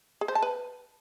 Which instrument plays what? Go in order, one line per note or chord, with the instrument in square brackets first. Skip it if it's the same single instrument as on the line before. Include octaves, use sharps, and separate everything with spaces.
[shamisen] G#4
C5
A5
B4